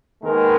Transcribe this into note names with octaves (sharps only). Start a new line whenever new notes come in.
D#2 D#3 G#3 B3 A#4